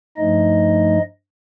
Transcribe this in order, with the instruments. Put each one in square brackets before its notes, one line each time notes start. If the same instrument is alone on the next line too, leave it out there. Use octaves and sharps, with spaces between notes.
[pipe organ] G2 F3 A3 D#4 D#5